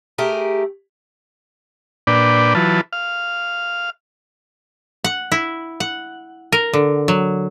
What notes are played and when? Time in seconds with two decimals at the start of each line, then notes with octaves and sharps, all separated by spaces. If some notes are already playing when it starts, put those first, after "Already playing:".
0.18 A3 G4 G#4 A#4
2.07 A#2 D4 B4 D5 G5
2.55 E3 F#3 F4 B4 A5
2.93 F5
5.04 F#5
5.32 E4
5.80 F#5
6.52 A#4
6.73 D3
7.08 F#3